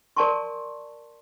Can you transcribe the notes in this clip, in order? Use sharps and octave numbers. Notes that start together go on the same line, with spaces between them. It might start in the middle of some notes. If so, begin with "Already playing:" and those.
A#4 D5 G#5 A5 C6 C#6